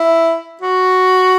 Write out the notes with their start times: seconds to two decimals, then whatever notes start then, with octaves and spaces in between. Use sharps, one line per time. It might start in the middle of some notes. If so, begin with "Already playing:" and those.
Already playing: E4
0.62 F#4